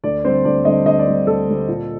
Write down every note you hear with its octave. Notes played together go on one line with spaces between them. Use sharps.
D2 D5
D3 G3 C4 C5
D2 D5
D3 G3 C4 D#5
D2 D#5
D5
D3 G3 C4
D2 A4
D3 G3 C4
A#2